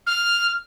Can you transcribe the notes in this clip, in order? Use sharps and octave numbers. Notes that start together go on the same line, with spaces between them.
F6